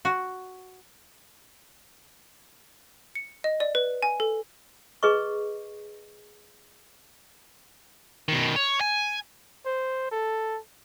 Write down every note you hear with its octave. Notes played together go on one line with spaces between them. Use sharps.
F#4
C#7
D#5
D5
B4
G#5
A4
G#4 B4 D#5 C#6
B2 D#3
C#5
G#5
C5
A4